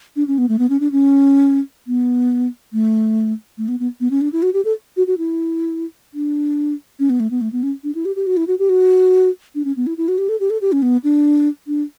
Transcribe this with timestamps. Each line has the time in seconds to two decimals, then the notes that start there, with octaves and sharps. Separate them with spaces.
0.16 D4
0.28 C#4
0.38 B3
0.49 A3
0.59 B3
0.70 C#4
0.80 D4
0.92 C#4
1.87 B3
2.73 A3
3.58 A3
3.68 B3
3.80 B3
4.01 B3
4.11 C#4
4.21 D4
4.33 E4
4.42 F#4
4.54 G4
4.65 A4
4.97 F#4
5.07 F#4
5.18 E4
6.14 D4
6.99 C#4
7.10 B3
7.20 A3
7.31 B3
7.41 A3
7.52 B3
7.63 C#4
7.84 D4
7.95 E4
8.05 G4
8.16 G4
8.27 F#4
8.37 E4
8.48 F#4
8.59 G4
8.69 F#4
9.55 D4
9.65 C#4
9.77 B3
9.87 E4
9.98 E4
10.08 F#4
10.18 G4
10.29 A4
10.40 G4
10.50 A4
10.62 G4
10.72 C#4
10.82 B3
11.04 D4
11.67 D4